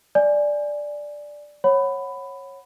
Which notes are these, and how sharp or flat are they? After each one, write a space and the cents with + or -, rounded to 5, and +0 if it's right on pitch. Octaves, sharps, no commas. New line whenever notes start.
D5 +0 G#5 +0
C#5 -20 F#5 +0 B5 +15